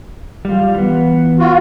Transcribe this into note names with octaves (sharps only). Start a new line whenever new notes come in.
G3 F4
E3 B3
F4 F#4